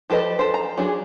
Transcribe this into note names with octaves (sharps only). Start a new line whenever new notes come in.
F3 G4 A4 B4 D#5
A4 C5
A#5
F#3 D4 G#4